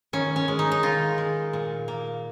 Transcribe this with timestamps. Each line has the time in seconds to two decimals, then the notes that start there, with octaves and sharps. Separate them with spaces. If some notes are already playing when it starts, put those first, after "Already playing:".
0.13 D#3 C#4
0.36 C#4
0.48 G#3
0.59 D#4
0.72 D#4
0.83 D#3 F4
1.18 G#3
1.53 A#2
1.88 A#3